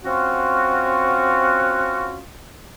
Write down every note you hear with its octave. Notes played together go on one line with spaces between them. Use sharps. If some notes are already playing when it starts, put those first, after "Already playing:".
C4 C#4 F4 F#4